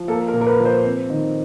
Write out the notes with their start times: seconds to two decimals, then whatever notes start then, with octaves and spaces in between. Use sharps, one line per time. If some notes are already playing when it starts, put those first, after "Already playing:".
Already playing: F3
0.08 A#3 A4
0.28 A#4
0.34 A#2
0.41 A#4
0.47 B4
0.59 F3
0.65 C5
0.84 C4
1.10 D#3